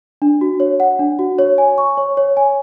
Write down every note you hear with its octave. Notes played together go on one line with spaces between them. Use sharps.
D4
F#4
C#5
F#5
D4
F#4
C#5
G#5
C#6
C#5
C#5
G#5